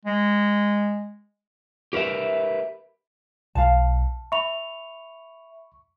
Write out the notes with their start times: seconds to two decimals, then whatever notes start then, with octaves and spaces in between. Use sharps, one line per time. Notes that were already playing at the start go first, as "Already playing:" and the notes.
0.05 G#3
1.93 G4 A#4 B4 E5
3.55 B1 F5 A5
4.32 E5 B5 C#6 F7